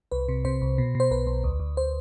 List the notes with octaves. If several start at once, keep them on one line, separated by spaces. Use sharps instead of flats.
C2 B4
C3
C3 C5
C2
B2
B2 C5
B1 B4
B1
D2
D2
C5